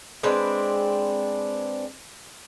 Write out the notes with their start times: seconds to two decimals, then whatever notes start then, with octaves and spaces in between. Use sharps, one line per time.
0.23 G#3 C4 D4 B4